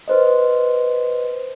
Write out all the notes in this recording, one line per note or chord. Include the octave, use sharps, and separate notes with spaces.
B4 C5 D#5